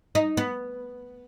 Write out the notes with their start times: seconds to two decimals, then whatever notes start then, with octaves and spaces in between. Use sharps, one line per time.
0.15 D#4
0.37 B3